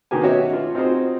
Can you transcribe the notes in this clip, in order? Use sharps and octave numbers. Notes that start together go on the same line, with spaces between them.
B2 D#3 A#3 F#4 G4 G#5
C#4 F#4 G4 C#5 D#5 E5
F4
C4 D#4 F4 F#4 G#4 C5